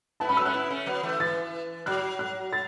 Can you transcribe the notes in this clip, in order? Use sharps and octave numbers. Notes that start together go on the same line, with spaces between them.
B3 E4 A5
A3 C#4 B5
F#3 B3 E6
A3 C#4 F#6
B3 E4
A3 C#4
F#3 B3
E3 A3
E3 A6
F#3 F#6
F#6
A6